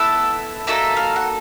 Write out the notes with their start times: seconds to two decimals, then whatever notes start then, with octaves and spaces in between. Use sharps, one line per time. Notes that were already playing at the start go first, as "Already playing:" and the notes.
Already playing: B3 E4 A4 E5
0.67 A#3 D#4 F#4 A4 E5
0.97 F5
1.16 F#5